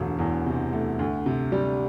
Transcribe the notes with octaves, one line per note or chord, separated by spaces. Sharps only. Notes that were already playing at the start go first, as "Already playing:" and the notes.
Already playing: E1 D2
E2
C3
A3
D2
C3
G3